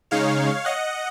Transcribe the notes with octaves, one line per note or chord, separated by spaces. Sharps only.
C#3 G#3 D#4 C#5 F5
D#5 F#5